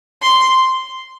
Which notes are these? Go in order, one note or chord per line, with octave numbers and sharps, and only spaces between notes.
C6